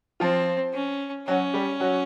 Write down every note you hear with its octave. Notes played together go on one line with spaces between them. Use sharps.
F3 C4 F4
C#4
F#3 C#4 F#4
G3 G4
F#3 F#4